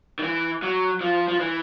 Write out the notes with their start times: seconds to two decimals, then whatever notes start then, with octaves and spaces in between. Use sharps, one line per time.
0.19 D#3
0.23 E3
0.63 F#3
1.01 F3
1.28 F3
1.40 E3